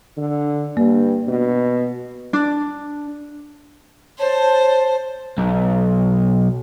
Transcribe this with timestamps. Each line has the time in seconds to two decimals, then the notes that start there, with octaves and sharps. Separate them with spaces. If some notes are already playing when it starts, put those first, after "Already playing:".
0.17 D3
0.77 G2 A#3
1.28 B2
2.33 D4
4.19 C5 C#5 A5
5.38 B1